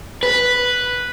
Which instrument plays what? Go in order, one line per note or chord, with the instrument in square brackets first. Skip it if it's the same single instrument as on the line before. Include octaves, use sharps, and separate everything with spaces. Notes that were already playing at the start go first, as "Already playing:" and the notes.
[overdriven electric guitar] B4